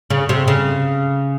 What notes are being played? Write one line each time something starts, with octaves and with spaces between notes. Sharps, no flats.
C#3
C3
C#3